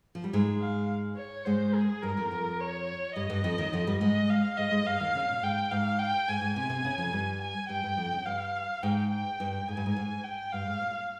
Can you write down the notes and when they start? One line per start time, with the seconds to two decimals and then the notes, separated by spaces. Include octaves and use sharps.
0.15 F3
0.24 G3
0.33 G#2 G#3
0.61 F5
1.17 C#5
1.46 G#2 G#3 C5
1.75 G#4
2.02 G2 G3 A#4
2.17 F2 F3
2.31 F2 F3
2.60 C#5
3.16 G2 G3 D#5
3.30 G2 G3
3.44 F2 F3
3.58 D#2 D#3
3.73 F2 F3
3.87 G2 G3
4.01 G#2 G#3 D#5
4.29 F5
4.57 G#2 G#3 D#5
4.71 G#2 G#3
4.85 G2 G3 F5
5.00 D#2 D#3
5.15 C#3
5.29 A#2
5.42 G#2 G5
5.71 G#2 F5
5.99 G5
6.28 G#2 G#5
6.41 G#2
6.56 C3 G#5
6.70 C3
6.85 C#3
6.98 F2 F3
7.13 G2 G3
7.41 G#5
7.69 G2 G3 G5
7.83 G2 G3
7.97 F2 F3
8.12 C#3
8.25 G2 F5
8.83 G#2 G5
9.10 G5
9.40 G2
9.68 G#2 G#5
9.77 G2
9.86 G#2
9.96 G#2
10.24 G5
10.52 G2 F5
10.67 G#2
10.81 A#2